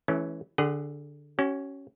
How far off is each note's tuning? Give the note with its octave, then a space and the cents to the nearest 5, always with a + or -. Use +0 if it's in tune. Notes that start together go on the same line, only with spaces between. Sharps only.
E3 -5 A3 -35 C#4 +0
D3 +0 G#4 -15 F#5 +30
C#4 +0 F#4 +45